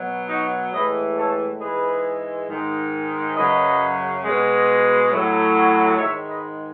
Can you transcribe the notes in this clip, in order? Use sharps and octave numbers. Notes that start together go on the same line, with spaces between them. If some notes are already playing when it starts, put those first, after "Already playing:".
Already playing: B2 F#3
D#4 F#4
A2 E3 G#3 B4 D#5
A4 C#5
G#2 E3 G#3 G#4 B4
G#2 D#3 G#3
F#2 C#3 F#3 B4 D#5
B2 G#3
A2 F#3
G#2 D#3 G#3 C#5 E5
B4 D#5